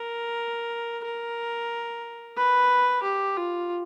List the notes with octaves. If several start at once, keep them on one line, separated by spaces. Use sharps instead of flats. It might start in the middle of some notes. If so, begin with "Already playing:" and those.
Already playing: A#4
A#4
B4
G4
F4